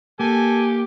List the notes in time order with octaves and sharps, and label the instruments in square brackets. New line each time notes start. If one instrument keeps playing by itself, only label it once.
[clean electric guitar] A#3 [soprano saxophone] G4 [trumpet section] A4 G#5